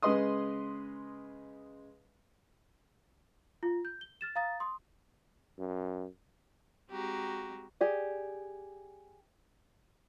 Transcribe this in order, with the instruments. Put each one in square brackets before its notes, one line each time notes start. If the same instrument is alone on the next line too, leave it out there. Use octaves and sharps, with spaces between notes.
[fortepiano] C#3 G#3 B4 D#5 C6 D#6
[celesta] F4
G6
G7
F6 A6 E7
F5 A#5 D#6 A6
C6 D#6
[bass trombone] F#2
[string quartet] G#3 C4 F#4 G4 A#5
[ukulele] G4 G#4 D5